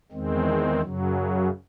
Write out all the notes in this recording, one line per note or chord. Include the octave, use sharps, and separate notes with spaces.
E2 D#3 G#3 C4
F#2 C#3 F#3